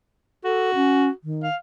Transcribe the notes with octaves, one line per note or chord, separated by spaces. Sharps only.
F#4 A4
C#4
D#3
F5